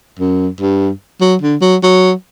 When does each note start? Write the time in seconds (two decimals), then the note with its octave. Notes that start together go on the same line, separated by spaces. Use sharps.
0.20 F#2
0.61 G2
1.21 F#3
1.42 D3
1.62 F#3
1.83 F#3